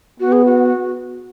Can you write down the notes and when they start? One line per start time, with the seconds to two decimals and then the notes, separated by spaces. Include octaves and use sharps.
0.20 B3 F#4
0.32 G#4
0.45 F#4